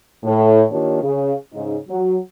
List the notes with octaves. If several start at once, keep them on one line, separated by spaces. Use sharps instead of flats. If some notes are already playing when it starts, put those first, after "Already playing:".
A2
D#3 A#3 D4 F4 G4 C#5
C#3
G#2 C#3 D#4
F#3